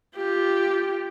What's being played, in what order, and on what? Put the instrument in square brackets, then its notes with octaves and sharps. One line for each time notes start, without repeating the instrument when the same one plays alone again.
[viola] F4 G4